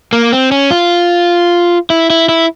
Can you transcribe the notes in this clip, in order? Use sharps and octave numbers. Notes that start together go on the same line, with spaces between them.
A#3
C4
C#4
F4
E4
E4
E4